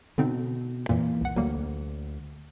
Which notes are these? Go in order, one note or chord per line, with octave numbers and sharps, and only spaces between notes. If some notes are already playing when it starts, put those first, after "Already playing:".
B2 D3 C4 D#4
F2 A#2 E3 A#3
C2 F#5
D2 F#3 G3 A#3